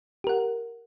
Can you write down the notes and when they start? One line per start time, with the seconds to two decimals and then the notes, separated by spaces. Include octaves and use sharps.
0.24 G4
0.27 A#4
0.29 F#5